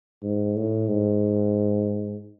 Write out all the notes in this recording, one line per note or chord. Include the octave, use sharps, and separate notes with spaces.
G#2
A2
G#2